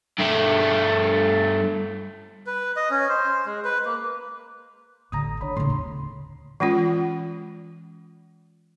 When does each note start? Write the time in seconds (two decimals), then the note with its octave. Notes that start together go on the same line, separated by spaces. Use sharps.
0.18 G2 A3
2.47 B4
2.76 D#5
2.90 C#4
3.09 C5
3.46 G#3
3.65 B4
3.85 A#3
5.12 A1 D3 A#5 D#6
5.41 D3 D4 C#5 B5
5.57 D#2 A2 C#3 C4 C6
5.70 D#4
6.60 E3 G#3 C#4 F4